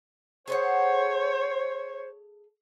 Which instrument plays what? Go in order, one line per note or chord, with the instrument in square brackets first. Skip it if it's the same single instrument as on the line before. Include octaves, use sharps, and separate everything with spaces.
[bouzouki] G#4 A4 F#5 [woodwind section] C5 [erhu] C#5